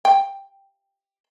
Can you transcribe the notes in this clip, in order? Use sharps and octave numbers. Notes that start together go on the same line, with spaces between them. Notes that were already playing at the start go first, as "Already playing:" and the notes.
G5